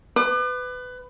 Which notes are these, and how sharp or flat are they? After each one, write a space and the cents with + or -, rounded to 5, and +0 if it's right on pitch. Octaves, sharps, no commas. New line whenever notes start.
B4 +20 D6 +45